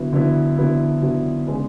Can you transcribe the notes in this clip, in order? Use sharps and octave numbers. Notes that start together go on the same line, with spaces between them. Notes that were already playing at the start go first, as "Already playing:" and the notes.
Already playing: D3 F#3 B3 E4
D3 F#3 B3 E4
D3 F#3 B3 E4
D3 F#3 B3 E4
C#3 G#3 B3 D4